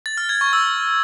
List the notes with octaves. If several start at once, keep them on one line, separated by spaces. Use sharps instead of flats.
A6
F6
G#6
C#6
E6